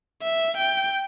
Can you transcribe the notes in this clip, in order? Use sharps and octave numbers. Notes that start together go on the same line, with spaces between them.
E5
G5